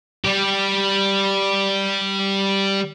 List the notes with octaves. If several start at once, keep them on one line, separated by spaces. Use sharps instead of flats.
G3 G4